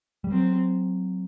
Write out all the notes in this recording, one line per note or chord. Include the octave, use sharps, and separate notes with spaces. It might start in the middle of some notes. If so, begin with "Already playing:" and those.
G3
F#3 C4